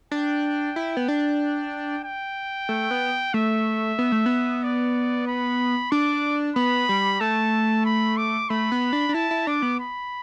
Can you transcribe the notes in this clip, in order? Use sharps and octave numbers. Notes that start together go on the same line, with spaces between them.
D4 G5
E4
B3
D4
G5
A3
B3
A3 E5
B3
A3
B3
D5
B5
D4 D6
B3 B5
G3
A3 A5
B5
D6
A3 B5
B3
D4
D4
E4 A5
E4
D4 D6
B3
B5